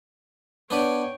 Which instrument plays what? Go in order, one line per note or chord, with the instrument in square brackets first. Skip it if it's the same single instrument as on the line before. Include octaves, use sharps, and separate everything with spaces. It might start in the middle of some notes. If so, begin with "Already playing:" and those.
[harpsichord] B3 D4 B4 [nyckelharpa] C#5 G5